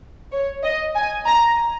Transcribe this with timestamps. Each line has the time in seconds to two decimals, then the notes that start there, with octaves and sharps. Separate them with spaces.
0.32 C#5
0.63 D#5
0.96 G#5
1.26 A#5